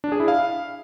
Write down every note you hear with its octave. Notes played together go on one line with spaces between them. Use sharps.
D4
G#4
E4
F5